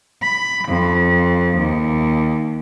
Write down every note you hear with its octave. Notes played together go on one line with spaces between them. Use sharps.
B5
F2
D#2